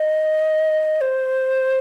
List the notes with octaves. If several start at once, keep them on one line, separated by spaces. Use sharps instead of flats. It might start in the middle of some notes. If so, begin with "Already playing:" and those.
Already playing: D#5
C5